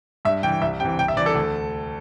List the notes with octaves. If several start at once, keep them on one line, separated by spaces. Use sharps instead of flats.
G2 E5
E3 G5
C2 E5
C3 E3 G5
C2 G5
E5
C3 E3 D5
A4
D2